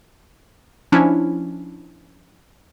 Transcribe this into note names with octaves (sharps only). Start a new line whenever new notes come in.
F3 C#4 D4 E4